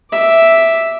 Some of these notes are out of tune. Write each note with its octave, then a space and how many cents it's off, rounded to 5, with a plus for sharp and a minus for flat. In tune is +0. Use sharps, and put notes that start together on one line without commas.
E5 +0 D6 +0